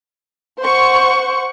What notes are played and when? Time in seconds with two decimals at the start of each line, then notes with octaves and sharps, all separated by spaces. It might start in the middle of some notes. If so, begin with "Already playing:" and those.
0.60 C5 F#5 C#6